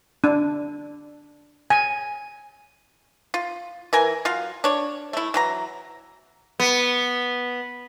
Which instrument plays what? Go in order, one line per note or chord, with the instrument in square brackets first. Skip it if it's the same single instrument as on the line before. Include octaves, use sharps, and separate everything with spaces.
[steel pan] D4
G#5
[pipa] F4
E3 A#4 G#5
F#3 F4 F5
D4 C#5
A3 E4
E3 F#3 A#5
[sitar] B3